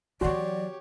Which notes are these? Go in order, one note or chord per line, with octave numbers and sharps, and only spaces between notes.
E3 F#3 F#4 G4 C#5 D5 C6